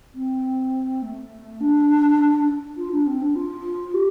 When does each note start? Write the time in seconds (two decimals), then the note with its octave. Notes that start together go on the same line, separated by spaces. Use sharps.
0.14 C4
1.02 A3
1.60 D4
2.77 F4
2.91 D4
3.06 C4
3.21 D4
3.35 F4
3.93 G4